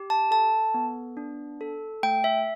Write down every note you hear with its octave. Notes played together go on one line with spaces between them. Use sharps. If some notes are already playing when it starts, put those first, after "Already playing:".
Already playing: G4
A5
A4 A5
B3
D4
A4
A3 G5
E5